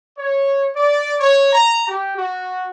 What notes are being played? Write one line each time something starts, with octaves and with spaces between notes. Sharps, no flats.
C#5
D5
C#5
A#5
G4
F#4